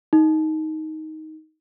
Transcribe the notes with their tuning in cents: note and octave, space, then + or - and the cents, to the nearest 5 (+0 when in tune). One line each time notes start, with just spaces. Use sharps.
D#4 +10